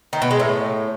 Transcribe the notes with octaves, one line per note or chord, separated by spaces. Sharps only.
D#3
B2
G#3
A2